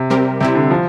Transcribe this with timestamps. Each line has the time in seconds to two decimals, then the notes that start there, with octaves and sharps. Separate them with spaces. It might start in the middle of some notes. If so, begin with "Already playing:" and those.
Already playing: C3
0.10 G3 C4 G4 A#4
0.40 C3 G3 C4 E4
0.55 D3
0.70 F3